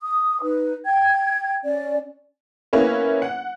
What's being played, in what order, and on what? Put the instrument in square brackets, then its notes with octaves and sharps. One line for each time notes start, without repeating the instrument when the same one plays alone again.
[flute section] D#6
D#4 B4
G5 G#6
C#4 D5
[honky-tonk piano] A#3 B3 C#4 E4
F#5